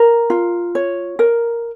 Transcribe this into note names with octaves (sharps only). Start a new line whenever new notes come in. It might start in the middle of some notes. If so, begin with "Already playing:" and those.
Already playing: A#4
F4
C#5
A#4